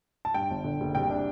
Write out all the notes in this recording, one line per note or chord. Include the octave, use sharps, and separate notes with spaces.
A5
G2 G5
G1
D3
F#1
C2 G5
D4